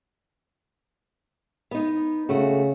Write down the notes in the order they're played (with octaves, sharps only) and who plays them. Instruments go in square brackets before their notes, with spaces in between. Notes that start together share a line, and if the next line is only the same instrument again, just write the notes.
[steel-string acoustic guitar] B3 D#4
[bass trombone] C#3 [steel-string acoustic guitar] A3 F#4